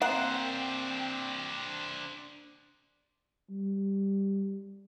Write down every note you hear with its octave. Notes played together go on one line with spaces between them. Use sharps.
A#3 C4 D4 C5 F#5 G5
G3